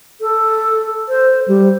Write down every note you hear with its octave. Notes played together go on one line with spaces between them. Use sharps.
A4
C5
G3